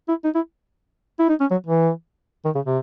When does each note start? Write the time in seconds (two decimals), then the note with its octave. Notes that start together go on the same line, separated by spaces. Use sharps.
0.09 E4
0.24 D#4
0.35 E4
1.20 E4
1.29 D#4
1.40 C#4
1.51 F#3
1.67 E3
2.45 D#3
2.55 C#3
2.66 C3